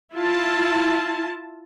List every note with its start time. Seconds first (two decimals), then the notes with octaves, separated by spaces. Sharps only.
0.14 E4 F4 A5